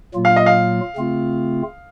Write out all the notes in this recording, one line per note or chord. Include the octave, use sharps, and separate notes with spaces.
A#2 F#3 A#3 F4
F5
D#5
F5
C#3 A3 C4 F4